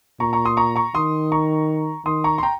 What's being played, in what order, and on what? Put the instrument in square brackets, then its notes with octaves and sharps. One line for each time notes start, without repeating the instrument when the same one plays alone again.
[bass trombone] A#2 [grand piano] A#5 C#6
[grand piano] A#5 C#6
C6 D#6
A#5 C#6
A#5 C#6
[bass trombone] D#3 [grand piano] C6 D#6
[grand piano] A#5 C#6
[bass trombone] D#3 [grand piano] C6 D#6
[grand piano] A#5 C#6
C6
G5 A#5